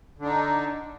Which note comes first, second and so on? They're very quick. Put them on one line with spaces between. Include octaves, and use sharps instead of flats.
D3 D4 D#4